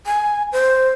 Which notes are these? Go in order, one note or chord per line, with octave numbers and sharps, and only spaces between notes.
G#5
C5